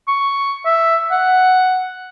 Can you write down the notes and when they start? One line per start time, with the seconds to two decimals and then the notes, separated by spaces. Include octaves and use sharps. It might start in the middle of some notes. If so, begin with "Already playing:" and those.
0.08 C#6
0.65 E5
1.11 F#5